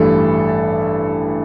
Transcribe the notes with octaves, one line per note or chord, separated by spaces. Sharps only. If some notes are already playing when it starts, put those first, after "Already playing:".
Already playing: A1 G2 E3 G3 A4